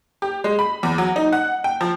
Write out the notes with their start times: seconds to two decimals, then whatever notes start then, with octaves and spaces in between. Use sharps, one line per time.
0.22 G4
0.44 G#3
0.59 B5
0.83 E2
0.98 F#3
1.16 D#4
1.33 F#5
1.64 G5
1.81 F3